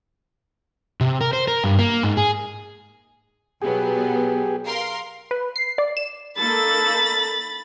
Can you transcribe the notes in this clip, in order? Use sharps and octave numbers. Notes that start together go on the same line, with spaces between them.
C3
A#4
C5
A#4
G2
A#3
G#2
G#4
B2 F#3 B3 G4 G#4
A#4 F5 C6
B4
C7
D5
E7
A#3 D#4 A4 B5 A6